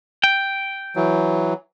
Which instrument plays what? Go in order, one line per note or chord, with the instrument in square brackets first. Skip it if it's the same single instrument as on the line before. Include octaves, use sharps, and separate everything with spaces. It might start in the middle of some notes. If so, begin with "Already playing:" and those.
[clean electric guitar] G5
[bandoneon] E3 F#3